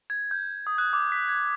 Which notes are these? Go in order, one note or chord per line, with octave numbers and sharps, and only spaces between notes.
G#6
G6
D#6
F#6
D6
B6
G#6